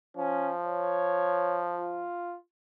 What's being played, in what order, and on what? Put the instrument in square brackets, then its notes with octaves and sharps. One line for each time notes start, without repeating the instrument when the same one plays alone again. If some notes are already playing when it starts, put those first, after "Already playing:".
[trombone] F3 [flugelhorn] C#4
[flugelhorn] C#5
F4